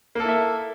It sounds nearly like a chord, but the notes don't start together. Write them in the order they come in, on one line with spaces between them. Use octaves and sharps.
A#3 A4 E4 E5